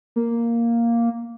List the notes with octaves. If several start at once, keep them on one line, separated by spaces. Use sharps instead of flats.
A#3